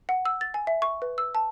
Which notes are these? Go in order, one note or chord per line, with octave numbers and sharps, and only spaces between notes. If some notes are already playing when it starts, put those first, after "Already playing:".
F#5
E6
A6
G#5
E5
C#6
B4
E6
A5